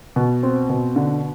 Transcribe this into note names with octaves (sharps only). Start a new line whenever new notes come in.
B2
C4
B2
D3